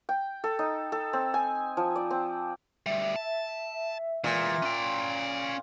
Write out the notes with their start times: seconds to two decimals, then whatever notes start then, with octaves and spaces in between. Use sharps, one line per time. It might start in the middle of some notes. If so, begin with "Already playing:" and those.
0.09 G5
0.44 A4
0.59 D#4
0.92 A4
1.13 C4
1.34 G#5
1.77 F3
1.96 D5
2.11 C4
2.86 D2 G3 E5
3.16 A5
4.24 A#2 E3 G#3
4.63 C#4 G5